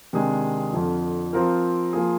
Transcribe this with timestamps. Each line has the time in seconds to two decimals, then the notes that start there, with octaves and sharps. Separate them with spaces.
0.13 C3 D#3 G#3 D4 G#4
0.73 F2 D3 F3
1.33 F3 C4 F4 A#4
1.93 F3 A#3 F4 G#4